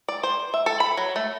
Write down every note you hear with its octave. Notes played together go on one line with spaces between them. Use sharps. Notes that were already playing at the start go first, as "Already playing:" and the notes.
D5
C5
E5
A4
B5
F#3
A3